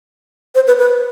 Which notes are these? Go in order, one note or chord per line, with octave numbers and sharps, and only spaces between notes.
C5
B4
B4